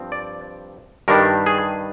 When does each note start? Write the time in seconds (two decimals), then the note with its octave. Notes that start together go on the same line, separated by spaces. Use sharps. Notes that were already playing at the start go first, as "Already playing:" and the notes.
Already playing: G2 F3 C4
0.12 D5
1.08 G2 D#3 G3 D4 A#4
1.46 G#4